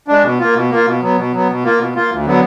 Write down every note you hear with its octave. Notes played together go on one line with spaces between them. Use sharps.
G#3 D4
B2
A#3 F4
B2
A#3 F4
B2
F#3 B3
B2
F#3 B3
B2
A#3 F4
B2
A#3 F4
D2
D3 F#3 B3